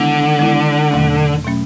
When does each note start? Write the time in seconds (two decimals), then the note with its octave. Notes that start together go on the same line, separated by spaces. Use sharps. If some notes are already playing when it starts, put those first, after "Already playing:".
Already playing: D3 D#3 G#3 B3 E4
0.38 D#3 G#3 B3 E4
0.91 E2 B2 F#3 A3 C#4
1.45 B2 F#3 A3 C#4